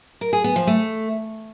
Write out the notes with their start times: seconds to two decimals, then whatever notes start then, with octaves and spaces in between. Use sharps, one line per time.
0.21 A#4
0.33 G#4
0.44 B3
0.56 F3
0.67 A3